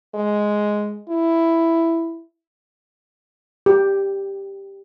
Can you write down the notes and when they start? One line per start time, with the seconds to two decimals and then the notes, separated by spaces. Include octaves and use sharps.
0.15 G#3
1.09 E4
3.66 G4